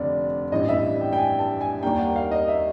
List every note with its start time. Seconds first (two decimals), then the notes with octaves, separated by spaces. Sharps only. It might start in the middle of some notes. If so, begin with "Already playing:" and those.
Already playing: F1 D3 D5
0.52 A1 G2 E3 G3 D#5
0.69 E5
1.01 G5
1.13 G5
1.18 G#5
1.39 A5
1.61 G#5
1.83 D#2 D#3 G3 A#3 G5
1.99 F#5
2.16 F5
2.31 D#5
2.48 E5